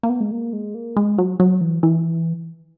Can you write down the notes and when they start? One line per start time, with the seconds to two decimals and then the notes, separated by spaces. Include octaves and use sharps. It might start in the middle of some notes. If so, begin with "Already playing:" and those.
0.03 A#3
0.10 B3
0.20 G#3
0.31 A#3
0.53 G#3
0.75 A#3
0.96 G#3
1.18 F#3
1.40 F#3
1.61 E3
1.83 E3